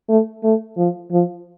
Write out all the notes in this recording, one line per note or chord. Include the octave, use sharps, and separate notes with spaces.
A3
A3
F3
F3